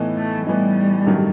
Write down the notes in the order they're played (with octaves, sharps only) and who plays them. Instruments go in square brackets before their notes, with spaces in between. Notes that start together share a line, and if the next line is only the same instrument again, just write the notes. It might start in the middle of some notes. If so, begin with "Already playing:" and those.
Already playing: [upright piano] A2 E3 B3 D#4
[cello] A3
[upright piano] A2 E3 B3 D#4 [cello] G3
[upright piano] A1 G2 D#3 F#3 A3